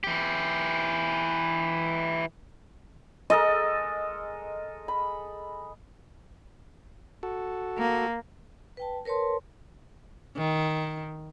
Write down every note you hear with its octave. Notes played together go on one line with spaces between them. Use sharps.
E3 G4
G#3 A4 A#4 D#5
B5
F#4 A4
A#3
B4 G5 A5
A#4 B4 C#5 A5 C6
D#3